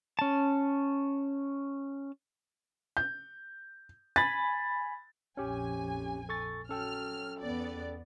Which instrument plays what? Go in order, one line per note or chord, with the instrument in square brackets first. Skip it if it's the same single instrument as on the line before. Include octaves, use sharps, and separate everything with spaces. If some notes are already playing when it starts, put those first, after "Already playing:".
[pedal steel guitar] C#4 A5
[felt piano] G6
[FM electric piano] G#5 B5 [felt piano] A6
[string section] A#1 F2 G#5 [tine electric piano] C#4 G4
[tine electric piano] A4 C#6 A6
[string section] F#3 F6 [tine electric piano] C#4 A4 G5
[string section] E2 B3 D5